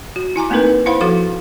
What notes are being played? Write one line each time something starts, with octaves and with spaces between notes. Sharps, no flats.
F#4
E4 G#5 A#5 D6
A3 A#3 C4 D#4 A#4 B4
E4 C5 F5 F#5 B5
F3 F#4 A4 F5 D6